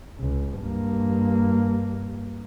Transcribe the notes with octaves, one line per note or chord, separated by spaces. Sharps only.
C#2
G2 A#3